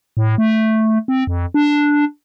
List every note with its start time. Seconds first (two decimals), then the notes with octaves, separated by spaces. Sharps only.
0.17 A2
0.38 A3
1.08 C4
1.27 F2
1.54 D4